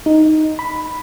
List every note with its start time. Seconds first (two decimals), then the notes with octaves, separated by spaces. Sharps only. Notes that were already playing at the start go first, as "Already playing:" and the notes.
0.06 D#4
0.59 B5